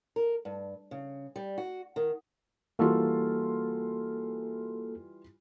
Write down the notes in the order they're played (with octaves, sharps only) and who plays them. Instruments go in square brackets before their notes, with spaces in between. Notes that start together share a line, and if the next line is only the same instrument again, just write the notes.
[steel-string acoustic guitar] A#4
G2
C#3
G3
F#4
D#3
[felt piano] E3 G3 F4 [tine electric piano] A#3 F#4 A4